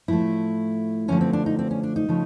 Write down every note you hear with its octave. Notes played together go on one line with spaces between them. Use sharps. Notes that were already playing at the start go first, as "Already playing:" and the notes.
A2 F3 A3 E4
D3 F3 A3 C#4
C4
D4
D#4
C4
C#4
D4
D#4
C#3 F3 A3